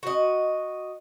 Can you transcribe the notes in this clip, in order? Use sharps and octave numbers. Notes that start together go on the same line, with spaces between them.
F#4 D#5